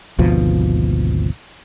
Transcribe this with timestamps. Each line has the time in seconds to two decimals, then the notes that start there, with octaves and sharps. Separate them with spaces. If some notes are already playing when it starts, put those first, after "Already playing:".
0.19 G#1 D2 B2 F3